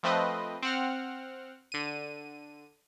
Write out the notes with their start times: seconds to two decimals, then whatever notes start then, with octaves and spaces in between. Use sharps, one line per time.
0.03 F3 A3 C4 B4 D#5
0.63 C4 F#5 F6
1.72 D3 D#7